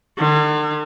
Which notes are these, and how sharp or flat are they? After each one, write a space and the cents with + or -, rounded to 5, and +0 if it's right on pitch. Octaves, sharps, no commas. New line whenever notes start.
D3 +45